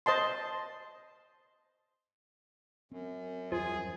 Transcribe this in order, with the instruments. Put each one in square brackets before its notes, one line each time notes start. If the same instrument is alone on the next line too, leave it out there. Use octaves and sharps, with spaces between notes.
[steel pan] C5 D#5 A5 C6
[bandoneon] F#2 [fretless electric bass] C4
[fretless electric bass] E2 G2 F#3 [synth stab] F3 [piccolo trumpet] G#4